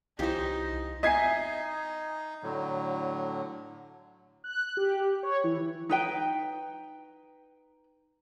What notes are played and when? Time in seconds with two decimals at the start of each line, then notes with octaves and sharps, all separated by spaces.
0.19 C2 E3 D#4 F4 G4 C5 C#5
1.03 D#4 D#5 E5 G#5 G#6 C7
2.43 A2 D3 F#3
4.44 F#6
4.77 G4
5.23 C#5
5.44 E3
5.89 D#4 B4 G5